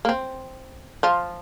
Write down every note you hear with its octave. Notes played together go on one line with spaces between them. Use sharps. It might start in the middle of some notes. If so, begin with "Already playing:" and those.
A#3
C4
F3 F4